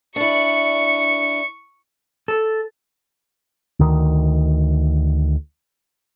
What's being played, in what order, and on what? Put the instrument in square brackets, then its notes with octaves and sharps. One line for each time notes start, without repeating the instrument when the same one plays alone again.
[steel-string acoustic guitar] D4 E4 [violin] C#6 C#7
[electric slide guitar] A4
[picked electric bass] D2 D#3